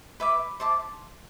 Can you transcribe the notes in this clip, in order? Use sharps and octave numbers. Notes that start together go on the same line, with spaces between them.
B4 E5 B5 D6
C5 E5 A5 D6